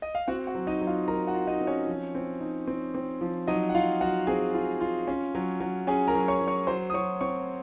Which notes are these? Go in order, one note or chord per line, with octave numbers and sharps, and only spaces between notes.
D#5
F5
C4 F#4 F#5
F#4 F#5
F#3
D#4 D#5
F#3
F4 F5
F#3 A#4 A#5
F#4 F#5
F4
D#4 D#5
C4
C#4 C#5
F3
C4
D#4
C4
C4
F3
F#3 D#4 D#5
F#5
F4 F5
F#3 F#4 F#5
C4 G#4 G#5
F4
F4
C#4
F#3
F#3
C#4 G#4 G#5
A#4 A#5
F#3
C#5 C#6
F#3
C#5 C#6
F#3 C5 C6
D#6
F#3 C#5 C#6
C4 C#5 C#6